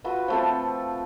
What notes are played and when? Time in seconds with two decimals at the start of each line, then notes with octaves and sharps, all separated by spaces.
0.04 F4 F#4 B4 E5
0.28 F3 A3 C4